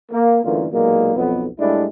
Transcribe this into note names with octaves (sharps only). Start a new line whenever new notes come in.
A#3
F#2 D3 E3 A3 A#3 F4
B1 A#2 F#3 G#3 A#3
B1 F2 B3
A2 G3 G#3 D4 E4